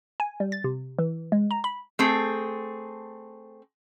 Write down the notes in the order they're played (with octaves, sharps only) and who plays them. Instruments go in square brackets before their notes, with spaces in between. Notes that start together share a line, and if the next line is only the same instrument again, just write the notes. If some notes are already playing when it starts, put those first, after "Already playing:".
[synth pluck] G#5
G3
A6
C3
E3
G#3
A#5
B5
[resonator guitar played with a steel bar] A3 C4 G#4